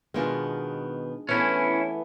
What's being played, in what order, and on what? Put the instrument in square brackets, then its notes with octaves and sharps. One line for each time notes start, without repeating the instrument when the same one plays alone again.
[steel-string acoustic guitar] B2 D#3 B3 [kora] G#3 D4 F4
[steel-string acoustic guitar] E3 A3 B3 [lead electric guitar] C#4 E4